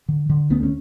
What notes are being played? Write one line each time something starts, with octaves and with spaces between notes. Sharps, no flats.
D3
D3
D2 B3 C#4
C#4